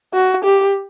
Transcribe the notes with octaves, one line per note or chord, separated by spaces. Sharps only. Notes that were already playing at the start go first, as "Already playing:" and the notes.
F#4
G4